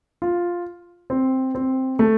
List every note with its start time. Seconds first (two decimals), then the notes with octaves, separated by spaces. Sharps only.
0.22 F4
1.10 C4
1.55 C4
1.99 A3